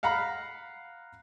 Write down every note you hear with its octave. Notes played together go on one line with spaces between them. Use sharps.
F5 F#5 A#5 B5